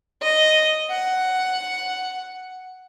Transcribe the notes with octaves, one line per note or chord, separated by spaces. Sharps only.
D#5
F#5